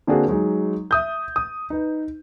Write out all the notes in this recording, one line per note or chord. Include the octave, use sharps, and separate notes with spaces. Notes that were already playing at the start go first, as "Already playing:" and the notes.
D3 A#3 C4 D4 F#4 G#4
F#3 G#3 D#4
E5 D#6 G6
D#6
D#4 B4